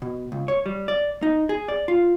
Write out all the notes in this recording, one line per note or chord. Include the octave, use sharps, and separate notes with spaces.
B2
C#2
C#5
G3
D5
D#4
G#4
D5
F4